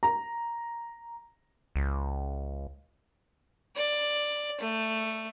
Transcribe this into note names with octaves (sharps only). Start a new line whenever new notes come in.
A#5
C#2
D5
A3